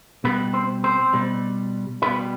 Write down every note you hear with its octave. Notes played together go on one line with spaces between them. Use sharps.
B2 G3 B3 B4
C4 C5
C4 C5
B2 G3
B2 G3 B3 B4